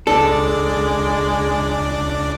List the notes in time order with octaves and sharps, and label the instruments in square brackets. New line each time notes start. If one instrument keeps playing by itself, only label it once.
[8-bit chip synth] C#2 D4 D5 [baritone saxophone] G#3 [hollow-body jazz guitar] A4